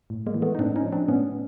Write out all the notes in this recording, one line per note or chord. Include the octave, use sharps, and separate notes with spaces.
A2
G#3 A#3
E3
A3 B3
D#4
A2 C4 D4
C#4 D#4
F3
C4 D4
A2 B3 C#4